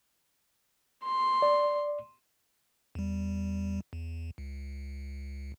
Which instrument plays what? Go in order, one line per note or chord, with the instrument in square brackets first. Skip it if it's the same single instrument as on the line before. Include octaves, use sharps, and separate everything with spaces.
[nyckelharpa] C6
[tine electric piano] D5
[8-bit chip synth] E2 G3
E2
C#2